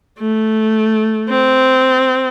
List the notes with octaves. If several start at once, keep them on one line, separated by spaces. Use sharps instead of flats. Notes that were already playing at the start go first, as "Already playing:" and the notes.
A3
C4